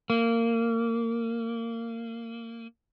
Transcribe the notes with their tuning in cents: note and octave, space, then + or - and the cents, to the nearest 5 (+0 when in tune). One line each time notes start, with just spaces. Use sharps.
A#3 -20